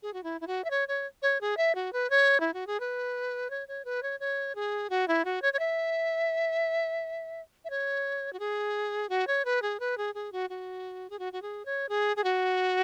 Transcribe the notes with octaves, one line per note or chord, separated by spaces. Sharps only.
G#4
F#4
E4
E4
F#4
E5
C#5
C#5
C#5
G#4
E5
F#4
B4
C#5
E4
F#4
G#4
B4
C#5
C#5
B4
C#5
C#5
G#4
F#4
E4
F#4
C#5
C#5
E5
E5
C#5
F#4
G#4
F#4
C#5
B4
G#4
B4
G#4
G#4
F#4
F#4
G#4
F#4
F#4
G#4
C#5
G#4
G#4
F#4